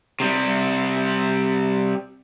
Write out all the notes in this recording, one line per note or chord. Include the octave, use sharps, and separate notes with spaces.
C3 G3